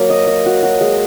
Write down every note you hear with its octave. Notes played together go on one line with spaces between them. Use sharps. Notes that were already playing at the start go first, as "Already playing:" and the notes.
Already playing: F#3 A#3
D#5
D#5
F#4
F#4
G#3